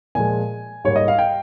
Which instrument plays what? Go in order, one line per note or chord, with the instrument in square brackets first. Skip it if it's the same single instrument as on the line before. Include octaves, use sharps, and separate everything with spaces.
[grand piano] A#2 F3 G#3 G#5
G#2 G3 A#3 C#5
D#5
F5
G5